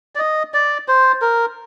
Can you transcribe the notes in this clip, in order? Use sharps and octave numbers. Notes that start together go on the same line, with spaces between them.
D5
D#5
D5
C5
A#4